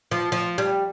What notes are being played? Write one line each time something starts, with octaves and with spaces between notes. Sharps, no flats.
F3
F3
G3